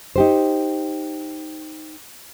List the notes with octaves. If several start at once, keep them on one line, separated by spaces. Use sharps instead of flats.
D#4 G4 C5